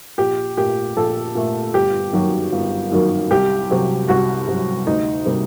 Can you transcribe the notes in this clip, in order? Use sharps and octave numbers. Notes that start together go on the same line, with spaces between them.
A#1 G4
A#2 A3 G4
A#1 A4
A#2 A3
G1 G4
F#2 D#3 F#3 A#3
G1
F#2 D#3 F#3 A#3
C2 G4
C3 F#3
C2 F#4
C3 F#3
D2 D#4
C3 G3 A#3